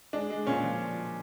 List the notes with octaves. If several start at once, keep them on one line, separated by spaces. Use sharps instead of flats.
G#3 D4
G#3
A#2 C#4
F3